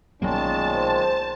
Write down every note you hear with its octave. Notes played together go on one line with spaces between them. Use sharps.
B1 A#2 D#3 F#3 G#3 A#3 C#4 A5
C5